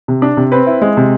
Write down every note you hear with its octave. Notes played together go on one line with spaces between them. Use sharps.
C3
D4
C3
C4 B4
E4
G#3
C3